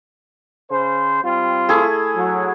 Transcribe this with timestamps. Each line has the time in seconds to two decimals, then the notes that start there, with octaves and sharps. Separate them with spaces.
0.71 C#3 C5
1.24 G3 C4 F4
1.69 A3 E4 G#4
2.15 F#3